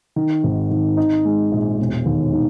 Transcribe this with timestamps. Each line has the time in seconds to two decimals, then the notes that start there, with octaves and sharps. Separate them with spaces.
0.16 D#3
0.44 G#1
0.71 D#3
0.97 D#4
1.25 G#3
1.51 A#1
1.79 E1
2.06 D#2
2.33 D#3